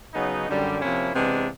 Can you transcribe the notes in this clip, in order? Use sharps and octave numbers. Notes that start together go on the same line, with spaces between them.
C#3 F#3 B3 D#4
F#2 D3 G3
C3 F3 A#3 C#4 E4
C3 E3 G#3 B3 D4